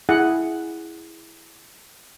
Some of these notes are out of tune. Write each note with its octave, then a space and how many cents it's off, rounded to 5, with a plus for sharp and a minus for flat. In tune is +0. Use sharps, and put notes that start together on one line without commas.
E4 +0 G#4 +0 F#5 +0